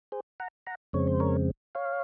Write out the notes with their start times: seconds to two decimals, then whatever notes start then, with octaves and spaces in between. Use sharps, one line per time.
0.12 G#4 C5
0.40 F#5 A#5
0.67 F#5 A#5
0.93 F2 C#3 G#3 C4 C#5
1.07 C5
1.20 A#4 C#5
1.75 C#5 F5